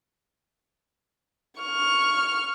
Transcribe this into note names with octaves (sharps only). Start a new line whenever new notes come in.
C#6 F6